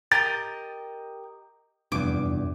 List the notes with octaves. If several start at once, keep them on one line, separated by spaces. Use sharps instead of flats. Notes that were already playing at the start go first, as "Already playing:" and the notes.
G4 A#4 D#5 A6
F1 E2 G2 D6